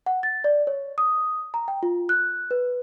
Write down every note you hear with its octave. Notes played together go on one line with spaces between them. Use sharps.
F#5
A6
D5
C#5
D#6
A#5
G5
F4
F#6
B4